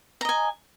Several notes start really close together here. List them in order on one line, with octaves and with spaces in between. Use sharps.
A#5 D#5 G#5